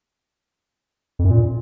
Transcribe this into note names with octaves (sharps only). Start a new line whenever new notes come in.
F2
F#2
A#2